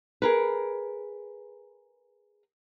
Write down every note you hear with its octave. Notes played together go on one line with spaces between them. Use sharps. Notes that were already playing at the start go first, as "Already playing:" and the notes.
G#4 A#4 B4